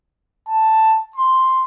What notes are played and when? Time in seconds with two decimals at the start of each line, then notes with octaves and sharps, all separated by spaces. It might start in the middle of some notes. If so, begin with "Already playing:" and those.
0.48 A5
1.16 C6